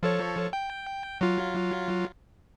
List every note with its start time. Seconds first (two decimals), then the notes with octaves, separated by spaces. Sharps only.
0.03 F3 A4 C#5
0.53 G5
1.21 F#3 F4